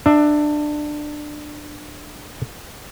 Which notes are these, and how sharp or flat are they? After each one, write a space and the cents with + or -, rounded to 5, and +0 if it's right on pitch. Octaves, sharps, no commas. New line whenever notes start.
D4 +20 E5 +0